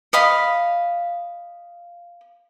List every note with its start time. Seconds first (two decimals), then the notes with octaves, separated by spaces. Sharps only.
0.13 D#5 F5 B5